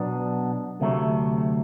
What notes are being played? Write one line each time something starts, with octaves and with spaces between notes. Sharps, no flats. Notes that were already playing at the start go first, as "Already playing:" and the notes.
Already playing: B2 F#3 B3 D4
D2 C3 F#3 A3